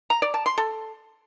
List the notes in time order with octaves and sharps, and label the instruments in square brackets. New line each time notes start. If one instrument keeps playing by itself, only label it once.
[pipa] A#5
D5
A5
C6
A4